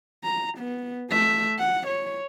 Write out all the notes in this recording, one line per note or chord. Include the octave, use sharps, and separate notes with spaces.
A#5
B3
A3 E5
F#5
C#5